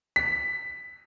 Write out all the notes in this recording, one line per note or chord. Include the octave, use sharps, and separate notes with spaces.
B6